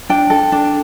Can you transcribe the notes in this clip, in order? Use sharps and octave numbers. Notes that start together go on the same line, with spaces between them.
D4 G5
A4
D4